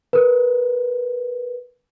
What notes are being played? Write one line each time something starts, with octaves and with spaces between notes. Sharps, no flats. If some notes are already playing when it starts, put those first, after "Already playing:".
A#4 B4